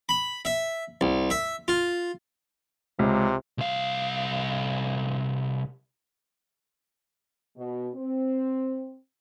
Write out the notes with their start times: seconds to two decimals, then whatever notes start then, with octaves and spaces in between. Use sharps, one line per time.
0.09 B5
0.45 E5
1.01 C2
1.30 E5
1.68 F4
2.99 C#2 C3
3.58 C2 F5
7.57 B2
7.95 C4